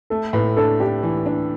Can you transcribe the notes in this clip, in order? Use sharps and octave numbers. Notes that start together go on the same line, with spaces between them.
A3 A4
A2 B4
D4 A4
D4 G4
E3
D4